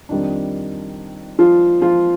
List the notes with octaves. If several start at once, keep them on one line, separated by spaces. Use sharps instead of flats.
F2 D#3 G3 D4
F3 F4
F3 F4